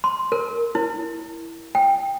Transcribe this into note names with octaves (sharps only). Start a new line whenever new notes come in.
C6
A#4
E4
G5